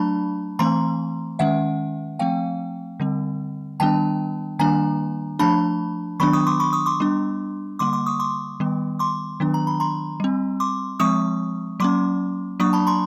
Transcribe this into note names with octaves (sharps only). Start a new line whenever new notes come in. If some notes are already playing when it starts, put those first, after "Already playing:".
Already playing: F#3 A3 D4 A5 B5
E3 A3 C4 A#5 C6
D#3 G#3 C#4 E5 F#5
F3 A3 C4 F5 G5
D3 G3 C4
D#3 G3 B3 D4 G5 A5
D#3 G3 A#3 D4 G#5 A#5
F3 A3 D4 A5 B5
D#3 F#3 B3 D4 B5 C#6
C#6 D#6
C6 D6
B5 C#6
C#6 D#6
C6 D6
G3 B3 D4
D3 G3 A#3 C6 D6
C6 D6
C#6 D#6
C6 D6
D#3 G3 B3
C6 D6
D#3 F#3 B3 D4
A#5
B5
A#5 C6
G3 C4
C6 D6
F3 G#3 C4 C#6 D#6
F#3 A#3 C#4 C6 D6
F#3 A#3 D4 C#6 D#6
A5 B5
A#5 C6